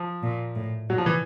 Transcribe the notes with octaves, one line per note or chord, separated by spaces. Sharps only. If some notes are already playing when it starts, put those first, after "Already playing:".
Already playing: F3
A#2
A2
A#2 F#3
F3
E3